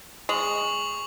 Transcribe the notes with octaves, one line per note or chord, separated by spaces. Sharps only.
G#3 C#6 F7 F#7